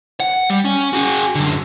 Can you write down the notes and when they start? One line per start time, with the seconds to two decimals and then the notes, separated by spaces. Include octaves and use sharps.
0.20 F#5
0.50 G3
0.65 C#4
0.93 F#4 G#4
1.35 F#2 D3